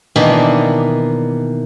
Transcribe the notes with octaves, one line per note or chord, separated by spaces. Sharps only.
B2 D#3 E3 A#3 D4